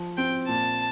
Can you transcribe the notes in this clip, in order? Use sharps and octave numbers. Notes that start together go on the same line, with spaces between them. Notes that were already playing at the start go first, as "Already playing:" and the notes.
Already playing: F3
C4 G5
A#2 A5